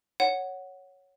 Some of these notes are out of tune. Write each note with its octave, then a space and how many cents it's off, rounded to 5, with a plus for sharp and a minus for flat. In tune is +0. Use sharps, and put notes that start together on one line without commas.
C#5 +0 F#5 +0